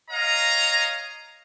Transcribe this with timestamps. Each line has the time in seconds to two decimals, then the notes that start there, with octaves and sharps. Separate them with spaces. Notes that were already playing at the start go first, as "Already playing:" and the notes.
0.11 C#5 D#5 F5 A#5